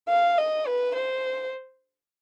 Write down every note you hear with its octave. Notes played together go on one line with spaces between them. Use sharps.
F5
D#5
B4
C5